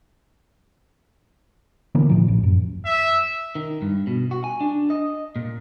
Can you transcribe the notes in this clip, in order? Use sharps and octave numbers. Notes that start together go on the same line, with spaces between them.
D3 E3 A#3 B3
A2 F3
A1
F#2
E5
D#3
G2
B2
F#4
G#5
D4
D#5
A#2